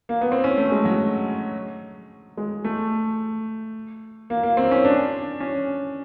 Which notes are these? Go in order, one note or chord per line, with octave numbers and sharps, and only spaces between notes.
A#3
B3
C4
C#4
A3
G#3
F#3
G#3
A3
A#3
A#3
C4
C#4
D4
C#4